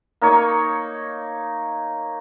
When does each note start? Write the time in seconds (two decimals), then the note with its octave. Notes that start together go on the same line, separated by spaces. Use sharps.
0.22 A#3 D#4 C#5